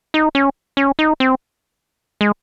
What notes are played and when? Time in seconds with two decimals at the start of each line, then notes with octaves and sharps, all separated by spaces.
0.14 D#4
0.35 C#4
0.77 C#4
0.99 D#4
1.20 C4
2.21 G#3